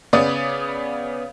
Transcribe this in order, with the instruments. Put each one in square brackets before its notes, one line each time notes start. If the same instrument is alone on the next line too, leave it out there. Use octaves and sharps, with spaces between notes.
[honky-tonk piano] C#3 B3 D5 D#6